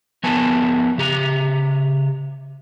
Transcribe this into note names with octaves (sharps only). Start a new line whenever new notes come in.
F3 B3 A#4 B4 G#5 A5
C#3 G4 A#5